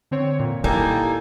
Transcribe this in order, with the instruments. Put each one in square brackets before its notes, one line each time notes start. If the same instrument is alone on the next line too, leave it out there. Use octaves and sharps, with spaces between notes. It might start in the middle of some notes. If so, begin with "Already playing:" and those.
[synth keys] D3 C4 C#5
A#2
[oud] G3 A#3 [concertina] D#4 A4 G#5 [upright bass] E4